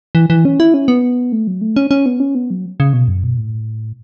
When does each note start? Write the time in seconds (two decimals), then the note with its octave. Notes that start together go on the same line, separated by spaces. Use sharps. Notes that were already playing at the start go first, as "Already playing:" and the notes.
0.15 E3
0.30 E3
0.45 C#4
0.60 E4
0.74 C#4
0.88 B3
1.32 A3
1.47 F#3
1.61 A3
1.76 C#4
1.91 C#4
2.06 B3
2.20 C#4
2.35 B3
2.50 F#3
2.80 C#3
2.93 B2
3.08 F#2
3.24 B2
3.37 A2